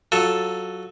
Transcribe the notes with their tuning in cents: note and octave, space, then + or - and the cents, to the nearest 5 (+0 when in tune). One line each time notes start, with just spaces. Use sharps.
F#3 +5 F4 +20 A4 +0